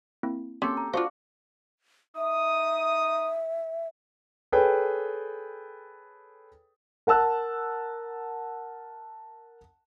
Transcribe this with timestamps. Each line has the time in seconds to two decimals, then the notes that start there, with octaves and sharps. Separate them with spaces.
0.23 A#3 C4 E4
0.62 A#3 C4 C#4 G4 A4 C6
0.77 A#5
0.93 D4 F4 F#4 C5 F5
2.16 D#4 E5 D#6
4.52 G#4 A4 B4 C#5 G5
7.07 A#4 F#5 A5 E6 F#6